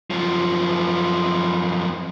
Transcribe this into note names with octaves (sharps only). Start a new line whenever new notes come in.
F#2 F3